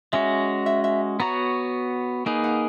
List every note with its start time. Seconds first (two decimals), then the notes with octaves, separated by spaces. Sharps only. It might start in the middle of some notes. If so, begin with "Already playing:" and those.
0.13 G#3 C#4 F#4 E5
0.66 E5
0.84 E5
1.20 B3 F#4 C#5 A#5
2.26 A#3 D#4 G#4 B4 G#5
2.44 F#5